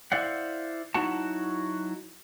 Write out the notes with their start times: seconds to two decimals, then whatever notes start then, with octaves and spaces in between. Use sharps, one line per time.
0.12 E4 C5 D5 F5 F#5
0.94 F#3 D#4 E4 F#4 F#5 A5